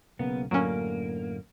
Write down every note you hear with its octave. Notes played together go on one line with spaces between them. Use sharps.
B1 C#3 A#3 B3
F#2 A2 D3 F#3 A#3 C#4